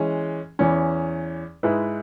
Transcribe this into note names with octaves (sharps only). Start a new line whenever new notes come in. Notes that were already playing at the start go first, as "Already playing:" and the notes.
Already playing: E3 G#3 C#4
E2 E3 C#4
G#2 G#3 E4 B4